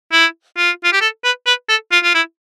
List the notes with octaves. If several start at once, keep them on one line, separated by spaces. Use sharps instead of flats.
E4
F4
F4
G4
A4
B4
B4
A4
F4
F4
E4